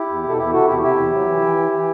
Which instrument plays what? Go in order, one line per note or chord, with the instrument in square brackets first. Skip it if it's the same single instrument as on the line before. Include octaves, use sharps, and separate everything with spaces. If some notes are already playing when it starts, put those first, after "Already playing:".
Already playing: [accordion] E4 G4
E2
B2
A4
E2 E4 G4
C3 F#4 A4
E2 E4 G4
C3 E4 G4
E2
F#3
E3
E3
E3
E3